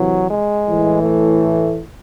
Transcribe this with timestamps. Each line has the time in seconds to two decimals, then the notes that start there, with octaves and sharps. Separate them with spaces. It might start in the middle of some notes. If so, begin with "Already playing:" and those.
Already playing: C3 E3 F#3
0.29 G#3
0.65 A2 E3
1.02 A3